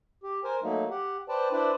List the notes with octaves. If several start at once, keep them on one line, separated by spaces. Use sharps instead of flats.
G4
A#4 C5 G#5
F#3 A3 A#3 D#4
G4 F#5
B4 C5 D5 G5 A5
D4 E4 B4 C5 D5